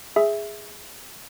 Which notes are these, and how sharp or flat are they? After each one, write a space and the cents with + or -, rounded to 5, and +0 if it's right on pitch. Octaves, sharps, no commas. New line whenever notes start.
G#4 +0 E5 +0